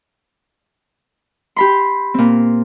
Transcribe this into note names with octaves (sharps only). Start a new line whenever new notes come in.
G4 B5 C6
A#2 C4